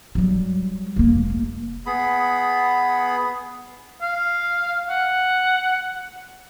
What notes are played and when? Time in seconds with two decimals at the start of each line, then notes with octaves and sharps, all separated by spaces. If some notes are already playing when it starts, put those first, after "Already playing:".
0.15 F#3 G3
0.96 F1 A#3
1.86 B3 G#4 B5
4.01 F5
4.89 F#5